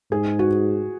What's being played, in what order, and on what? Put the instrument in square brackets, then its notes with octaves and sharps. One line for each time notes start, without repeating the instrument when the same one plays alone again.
[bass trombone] G#2 [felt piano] G#4
[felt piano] F#4